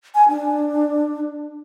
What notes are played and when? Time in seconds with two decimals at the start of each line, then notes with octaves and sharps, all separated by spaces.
0.15 G#5
0.29 D4